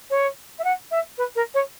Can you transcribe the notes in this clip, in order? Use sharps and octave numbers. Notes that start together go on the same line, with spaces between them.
C#5
E5
F#5
E5
B4
A#4
C#5